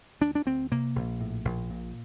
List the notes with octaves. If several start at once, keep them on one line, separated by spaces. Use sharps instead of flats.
D2 D4
D4
D2 C4
C3 A#3
A#1
A2
A#1
A#2